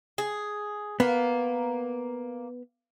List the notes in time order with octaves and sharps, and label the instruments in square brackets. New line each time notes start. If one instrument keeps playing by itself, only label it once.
[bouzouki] G#4
[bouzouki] A#3 [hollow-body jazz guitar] B3